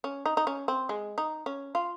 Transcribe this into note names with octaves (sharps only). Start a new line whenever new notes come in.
C#4
D#4
D#4
C#4
C4
G#3
D#4
C#4
F4